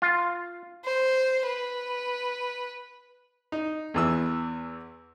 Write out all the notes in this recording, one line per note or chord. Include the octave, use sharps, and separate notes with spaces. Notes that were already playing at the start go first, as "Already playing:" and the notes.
F4
C5
B4
D#4
E2 E3 E6